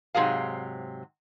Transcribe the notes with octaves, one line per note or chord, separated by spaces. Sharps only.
G#2 C3 F#3 G#4 F5